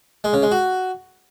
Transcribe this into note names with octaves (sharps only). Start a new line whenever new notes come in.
G#3
C#3
G#3
F#4